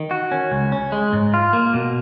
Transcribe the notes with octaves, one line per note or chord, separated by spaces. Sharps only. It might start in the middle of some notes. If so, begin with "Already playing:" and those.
Already playing: D#3
F#4
C#4
C#2
C#4
G#3
G#2
F4
A#3
B2